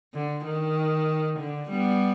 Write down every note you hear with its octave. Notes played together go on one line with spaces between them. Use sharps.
D3
D#3
D3
G3 B3